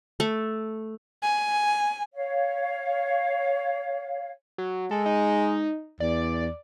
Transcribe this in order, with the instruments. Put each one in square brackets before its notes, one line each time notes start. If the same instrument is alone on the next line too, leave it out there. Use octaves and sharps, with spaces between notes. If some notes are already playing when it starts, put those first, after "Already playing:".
[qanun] A3
[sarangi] G#5
[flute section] C#5 F5
[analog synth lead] F#3
[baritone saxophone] G#3 [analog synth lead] A4
[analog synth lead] D#4
[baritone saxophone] E2 [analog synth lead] D5